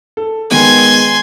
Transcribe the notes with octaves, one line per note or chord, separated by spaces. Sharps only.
A4
D#3 G#3 B3 G#5 C6